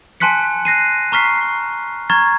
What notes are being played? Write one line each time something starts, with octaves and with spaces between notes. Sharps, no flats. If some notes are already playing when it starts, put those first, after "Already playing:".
G#5 A5 C6 F#6 B6 C#7
F#6 A#6 C7 D#7
A#5 C#6 F6 B6 C7
A#5 C#6 F6 G#6 A6